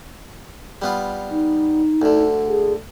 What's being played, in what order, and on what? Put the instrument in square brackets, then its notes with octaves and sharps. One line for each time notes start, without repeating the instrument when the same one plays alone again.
[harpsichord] G3 B3 F4
[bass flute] D#4
[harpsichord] D2 D3
[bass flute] G#4